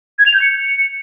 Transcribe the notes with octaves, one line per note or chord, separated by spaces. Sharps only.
G#6
F7
G6
C#7